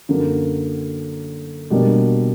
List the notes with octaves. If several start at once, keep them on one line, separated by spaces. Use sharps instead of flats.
F#2 D3 F#3 A#3
B2 G3 A#3 D4